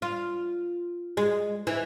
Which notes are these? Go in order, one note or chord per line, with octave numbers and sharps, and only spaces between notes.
F4
G#3
E3